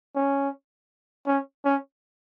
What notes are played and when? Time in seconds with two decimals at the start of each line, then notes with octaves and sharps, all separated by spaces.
0.16 C#4
1.27 C#4
1.65 C#4